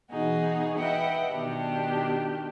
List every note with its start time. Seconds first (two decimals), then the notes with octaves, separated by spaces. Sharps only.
0.10 B2 E3 D#4 F#4 G#4
0.75 B4 D#5 E5 F#5 G5
1.30 B2 D#3 D4 G4